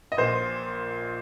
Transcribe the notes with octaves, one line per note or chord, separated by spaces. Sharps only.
D#5
A#1 A#2 C5